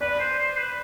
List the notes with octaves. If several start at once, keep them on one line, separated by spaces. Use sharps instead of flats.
B4 D5
C5
C5
B4